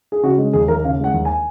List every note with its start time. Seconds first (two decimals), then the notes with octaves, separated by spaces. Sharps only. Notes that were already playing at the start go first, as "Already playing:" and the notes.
0.12 G#4
0.23 C#3 F#4
0.38 G#3
0.53 D#2 G#4
0.68 D#2 A#4
0.84 C#3 F5
1.00 G#3 F#5
1.14 D#2
1.25 G#5